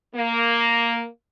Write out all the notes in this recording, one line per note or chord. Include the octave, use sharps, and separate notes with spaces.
A#3